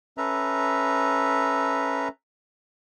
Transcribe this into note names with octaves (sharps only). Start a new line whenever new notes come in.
C#4 A4 B4 E5 A#5